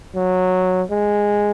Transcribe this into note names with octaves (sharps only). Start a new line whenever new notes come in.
F#3
G#3